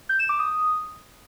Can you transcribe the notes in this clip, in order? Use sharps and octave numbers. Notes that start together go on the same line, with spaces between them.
G6
E7
D6
D#6